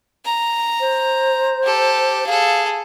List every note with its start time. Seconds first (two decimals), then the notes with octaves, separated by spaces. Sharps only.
0.25 A#5
0.80 C5
1.63 G4 A4
2.27 G#4 A4 F5